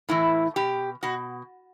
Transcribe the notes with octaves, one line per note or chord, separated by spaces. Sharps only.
A2 E3 E4
B2 G4
B2 F#4